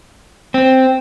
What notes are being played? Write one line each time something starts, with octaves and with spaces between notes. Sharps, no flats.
C4